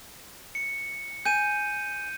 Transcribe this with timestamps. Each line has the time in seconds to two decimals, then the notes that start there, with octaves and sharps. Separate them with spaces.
0.55 C#7
1.25 G#5 G6 D#7